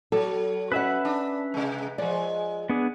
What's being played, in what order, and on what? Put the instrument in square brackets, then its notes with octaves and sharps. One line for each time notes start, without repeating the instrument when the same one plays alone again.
[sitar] F#3 [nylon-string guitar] A4
[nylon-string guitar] C#4 D#5 F#5 [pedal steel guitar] B4 E5 B5
[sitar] D4
C3 G#3
[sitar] F3 G#3 [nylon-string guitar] D5
[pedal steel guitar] B3 D4 G#4